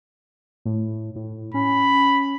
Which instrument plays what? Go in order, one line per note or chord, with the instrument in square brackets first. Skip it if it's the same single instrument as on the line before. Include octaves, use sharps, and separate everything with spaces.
[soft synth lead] A2
A2
[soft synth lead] C#4 [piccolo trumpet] B5